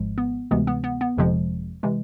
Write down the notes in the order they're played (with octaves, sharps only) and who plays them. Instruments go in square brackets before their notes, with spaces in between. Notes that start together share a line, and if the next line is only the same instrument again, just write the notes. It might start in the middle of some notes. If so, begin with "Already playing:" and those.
Already playing: [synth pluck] G#1 G#2 F3 G#3
B3
D2 C3 E3 G#3 B3
B3
B3
B3
G1 F2 C3 F3 G#3
C3 E3 G#3